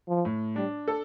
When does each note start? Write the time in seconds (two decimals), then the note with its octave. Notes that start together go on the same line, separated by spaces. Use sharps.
0.09 F3
0.25 A2
0.56 G3 D4
0.88 A4